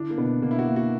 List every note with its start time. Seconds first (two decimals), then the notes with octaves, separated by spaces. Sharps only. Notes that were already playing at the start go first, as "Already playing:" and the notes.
Already playing: D3 D4 E4
0.10 A#3
0.18 B2 B3
0.42 B2 A#3
0.51 E4
0.59 F#4
0.68 A#3
0.76 F#4